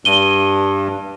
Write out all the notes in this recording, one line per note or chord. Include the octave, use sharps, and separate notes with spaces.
G2 D#7 G7